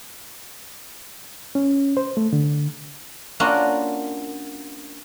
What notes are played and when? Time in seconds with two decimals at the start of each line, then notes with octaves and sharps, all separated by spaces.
1.55 C#4
1.97 C5
2.17 A3
2.33 D3
3.40 A#3 C#4 D4 F4 F#4 A#4